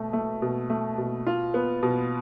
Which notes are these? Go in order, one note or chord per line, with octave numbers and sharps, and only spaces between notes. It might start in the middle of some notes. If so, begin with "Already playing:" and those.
Already playing: B2 A3
A3
B2
A3
B2
F4
B3
B2